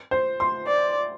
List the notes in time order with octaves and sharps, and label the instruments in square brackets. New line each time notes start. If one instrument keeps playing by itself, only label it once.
[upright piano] C5
C6
[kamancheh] D5